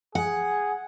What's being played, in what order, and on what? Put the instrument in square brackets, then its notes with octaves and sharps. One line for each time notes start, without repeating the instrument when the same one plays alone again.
[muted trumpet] G#4 [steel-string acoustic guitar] F#5